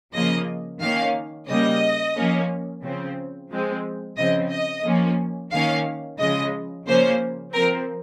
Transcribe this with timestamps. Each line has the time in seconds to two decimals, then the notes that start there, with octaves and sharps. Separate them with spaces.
0.13 C#3 F3 A#3 D#5
0.81 D#3 A#3 C#4 F5
1.48 C#3 G3 A#3 D#5
2.16 F3 A#3 C#4
2.82 C#3 F3 C4
3.51 F3 G#3 C4
4.17 C#3 F3 C4 D#5
4.50 D#5
4.85 F3 A#3 C#4
5.51 D#3 A#3 C#4 F5
6.19 C#3 F3 G#3 D#5
6.86 C#3 F3 A#3 C#4 C5
7.53 F3 C4 A#4